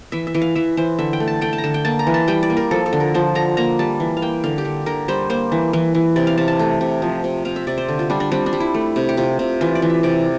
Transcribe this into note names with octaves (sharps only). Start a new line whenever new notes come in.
E3 E5
E5
E3
F5
E3 E5
E3 C5
D3 E5
G5
A3
A5
A3 G5
A5
A#5
D3 A5
G5
A#3 A5
A#5
E3
A5
G3 G5
D5
A#3
A#4
F3 A4
A4
D3
A#4
F3 C5
D3 A#5
A#3 A#5
G3 A5
E3
F5
A#3 G5
D3 F5
G4
D3
D3 A#4
G3 C5
A#3 C5
E3
E3
E3
C3 D5
F5
C3 A5
A5
A3
C3
F3
C3
C3 F5
E5
C3 D5
C5
D3
F4
G3 D4
D4
G3 C4
D4
G3
E4
A3
C3
G4
C3 F4
C3
E3 F4
D5
E3
E5
C3 D5